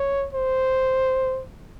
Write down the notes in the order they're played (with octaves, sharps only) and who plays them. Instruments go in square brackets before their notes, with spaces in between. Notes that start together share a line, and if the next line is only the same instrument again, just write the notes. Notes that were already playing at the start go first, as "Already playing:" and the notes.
Already playing: [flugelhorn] C#5
C5